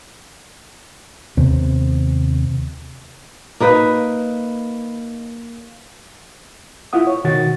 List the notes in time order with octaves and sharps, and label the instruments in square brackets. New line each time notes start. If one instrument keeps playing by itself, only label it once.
[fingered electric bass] D#2 C3 B3 C4
[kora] A#3 D#4 B4
[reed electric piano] E4 F4 F#5 D#6
C#5
B2 D#3 F#4 A6